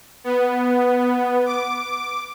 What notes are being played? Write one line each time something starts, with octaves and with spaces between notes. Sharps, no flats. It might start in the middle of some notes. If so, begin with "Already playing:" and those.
B3
D6